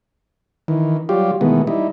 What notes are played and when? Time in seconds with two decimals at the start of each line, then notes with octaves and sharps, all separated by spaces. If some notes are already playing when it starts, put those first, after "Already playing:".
0.68 D#3 E3
1.09 F#3 G3 F4 G4
1.41 B2 D#3 E3 G#3 A3 B3
1.67 G3 D#4 E4